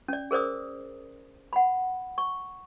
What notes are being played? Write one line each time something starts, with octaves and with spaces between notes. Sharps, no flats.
C#4 D5
G#4 A#4 C5 D5 D#6
F#5 B5
C#6